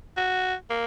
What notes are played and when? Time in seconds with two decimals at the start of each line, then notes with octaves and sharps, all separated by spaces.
0.17 F#4
0.70 A#3